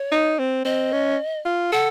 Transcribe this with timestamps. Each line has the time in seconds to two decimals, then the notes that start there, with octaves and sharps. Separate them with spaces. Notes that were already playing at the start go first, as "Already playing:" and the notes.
Already playing: C#5
0.12 D#4
0.39 C4
0.65 C4 D#5
0.93 C#4
1.45 F4
1.72 A4 F#5